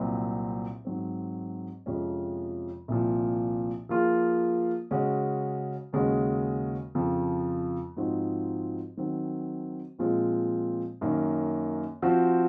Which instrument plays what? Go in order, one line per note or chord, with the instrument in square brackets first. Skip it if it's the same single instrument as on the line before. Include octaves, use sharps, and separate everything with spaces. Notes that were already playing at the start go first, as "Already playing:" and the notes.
Already playing: [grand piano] C2 A#2 F#3 C4
G#2 F#3 C4
F2 C3 F3 G#3 C#4
C2 A#2 F3
F3 A#3 F4 G#4
C#3 G#3 C#4 F#4
D#2 C#3 G#3 C#4 F#4
F2 C#3 F3
G#2 F3 C4 D#4 F#4
D#3 F#3 C4 F#4
A#2 F3 G#3 C4 F4
F#2 D#3 A#3 C#4
F3 C4 F#4